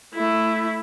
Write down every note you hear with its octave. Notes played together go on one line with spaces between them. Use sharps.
A3 E4